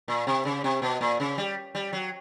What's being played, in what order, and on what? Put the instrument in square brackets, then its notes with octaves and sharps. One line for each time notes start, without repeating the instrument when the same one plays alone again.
[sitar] A#2
C3
C#3
C3
B2
A#2
C#3
G3
G3
F#3